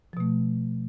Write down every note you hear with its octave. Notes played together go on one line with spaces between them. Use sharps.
B2 F3 A3